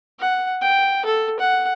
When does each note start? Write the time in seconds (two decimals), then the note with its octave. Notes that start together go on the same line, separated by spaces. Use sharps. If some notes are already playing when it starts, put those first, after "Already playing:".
0.20 F#5
0.61 G5
1.05 A4
1.39 F#5